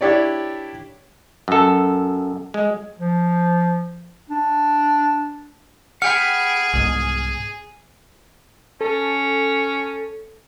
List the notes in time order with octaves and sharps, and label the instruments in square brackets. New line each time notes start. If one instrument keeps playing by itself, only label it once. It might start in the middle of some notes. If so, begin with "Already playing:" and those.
[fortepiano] D4 E4 G4 C#5 D5
[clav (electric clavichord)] F#2 A4
G#3
[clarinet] F3
D4
[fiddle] G#4 [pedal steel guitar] F#5 G5 B5 [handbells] F6
[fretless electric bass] C2 G#2 B2 [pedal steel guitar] D#6
[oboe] C#4 [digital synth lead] A4